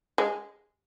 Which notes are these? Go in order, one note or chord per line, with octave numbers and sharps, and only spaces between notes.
G#3